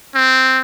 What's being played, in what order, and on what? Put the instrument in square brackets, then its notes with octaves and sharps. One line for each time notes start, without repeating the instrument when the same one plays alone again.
[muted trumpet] C4